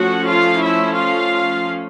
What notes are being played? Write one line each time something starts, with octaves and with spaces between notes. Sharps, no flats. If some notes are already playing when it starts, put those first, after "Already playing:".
Already playing: F3 A3 C#4 F#4 F#5
F4 F5
E4 E5
F4 F5